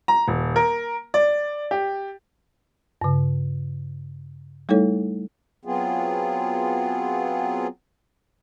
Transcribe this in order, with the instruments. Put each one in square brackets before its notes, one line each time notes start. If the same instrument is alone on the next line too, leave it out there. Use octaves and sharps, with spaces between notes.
[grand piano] A#5
D#1
A#4
D5
G4
[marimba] G2 C#3
G3 A3 D#4 E4 A4 C#5
[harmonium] F#3 B3 C4 F4 G#4